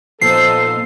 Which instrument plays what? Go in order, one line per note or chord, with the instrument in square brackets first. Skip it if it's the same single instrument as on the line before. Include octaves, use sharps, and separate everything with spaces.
[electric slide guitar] A#2 F3 B3 [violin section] D#4 C5 F5 [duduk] A4 [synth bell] C7